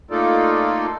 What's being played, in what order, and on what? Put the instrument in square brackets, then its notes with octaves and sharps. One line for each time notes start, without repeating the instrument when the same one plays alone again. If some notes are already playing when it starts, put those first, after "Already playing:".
[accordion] A3 A#3 D#4 F4 A4 D5